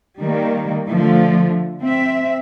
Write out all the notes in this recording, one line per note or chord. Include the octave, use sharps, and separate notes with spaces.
D#3 G3 A#3
D3 F3 A3
C4 E5